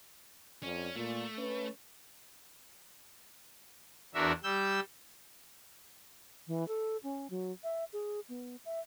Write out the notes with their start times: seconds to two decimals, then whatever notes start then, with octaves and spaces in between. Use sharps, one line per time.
0.63 F2 C#4 D5
0.96 A#2 A3
1.38 C#4 B4
4.14 E2 D4 F#4 A#4 E5
4.43 G3 E6 G6
6.47 E3
6.68 A4
7.03 C#4
7.30 F#3
7.64 E5
7.93 G#4
8.29 B3
8.65 E5